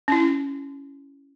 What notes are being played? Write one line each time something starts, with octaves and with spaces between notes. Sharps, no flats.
C#4 E4